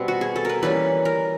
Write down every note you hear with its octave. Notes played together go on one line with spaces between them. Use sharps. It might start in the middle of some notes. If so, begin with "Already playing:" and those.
Already playing: B2 G3 C4
F#4
G#4
A4
A#4 B4
E3 G3 A#3 C#4 B4
A#4